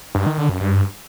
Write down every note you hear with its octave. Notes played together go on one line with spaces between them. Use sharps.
G2
D#3
D3
F#2
G2